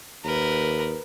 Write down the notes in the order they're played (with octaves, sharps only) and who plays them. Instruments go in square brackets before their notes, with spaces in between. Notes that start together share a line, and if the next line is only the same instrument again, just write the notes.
[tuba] D#2 [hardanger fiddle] A#4 B4